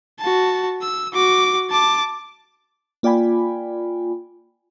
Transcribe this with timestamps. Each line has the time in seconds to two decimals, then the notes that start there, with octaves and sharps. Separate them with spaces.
0.19 F#4 A5
0.81 E6
1.13 F#4 D6
1.70 A5 D6
3.03 A#3 F4 D5 G5 G#5 B5